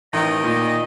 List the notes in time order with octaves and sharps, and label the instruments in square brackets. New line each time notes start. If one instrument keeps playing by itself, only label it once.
[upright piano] A1 [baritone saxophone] D#3 [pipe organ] D#5
[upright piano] A#2